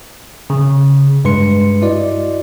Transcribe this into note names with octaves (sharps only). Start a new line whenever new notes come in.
C#3
G2 G#3 B4 C6 C#7
E4 F#4 D5 D#5